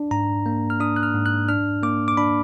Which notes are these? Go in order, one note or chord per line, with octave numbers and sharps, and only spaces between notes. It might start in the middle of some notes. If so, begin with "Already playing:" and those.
Already playing: D4
G#2 A#5
A#3
F6
D4 D#6
F#6
F6
G#2
F#6
D4 F6
A#3 D6
D6
D4 B5